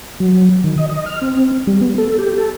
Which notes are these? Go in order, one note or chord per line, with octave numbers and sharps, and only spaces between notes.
F#3
D#3
D#5
D#5
F6
C4
G3
B3
A4
G4
A4